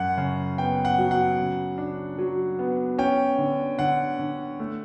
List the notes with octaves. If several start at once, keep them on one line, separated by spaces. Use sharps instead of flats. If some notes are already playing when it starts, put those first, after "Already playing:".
Already playing: F#2 F#5
C#3
B3 G5
F#5
F#3
F#5
C#3
D4
F#3
B3
C#4 G5
D3
D3 F#5
D3
A3